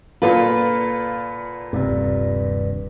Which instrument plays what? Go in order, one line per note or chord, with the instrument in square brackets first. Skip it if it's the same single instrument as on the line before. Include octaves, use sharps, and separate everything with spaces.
[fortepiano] A#2 D3 B5 [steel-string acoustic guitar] F4 B4
[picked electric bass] D#1 C3 [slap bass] G2